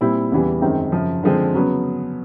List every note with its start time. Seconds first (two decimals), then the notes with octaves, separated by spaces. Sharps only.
0.01 A#2 G3 C4 E4
0.32 E2 C#3 E3 G3
0.61 F#2 D#3 G#3 C4
0.92 F#2 C#3 F3
1.23 D3 F3 G#3 C4
1.54 C#3 F#3 B3